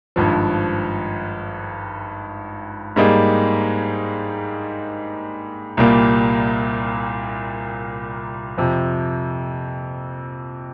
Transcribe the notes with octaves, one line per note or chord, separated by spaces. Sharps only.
G#1 G2 F3
G#2 G3 A#3 D#4 G#4
C2 A#2 G3 A#3
F2 C3 F3